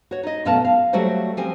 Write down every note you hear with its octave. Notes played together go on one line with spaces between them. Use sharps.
F#4 C#5
D#4 D#5
F#2 B2 A3 B3 F5 A5
F5
F#3 G3 A3 F#4 C5
F3 G3 C4 G#5